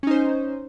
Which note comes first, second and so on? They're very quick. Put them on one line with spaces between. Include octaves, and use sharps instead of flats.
C#4 D#4 C5